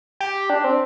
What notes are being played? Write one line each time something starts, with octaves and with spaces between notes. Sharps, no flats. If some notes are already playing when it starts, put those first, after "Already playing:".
G4
D4
C4